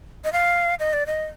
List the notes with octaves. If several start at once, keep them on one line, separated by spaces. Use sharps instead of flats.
D#5
F5
D#5
D5
D#5